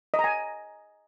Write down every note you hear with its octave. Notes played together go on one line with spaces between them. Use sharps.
D#5
A#5
G#5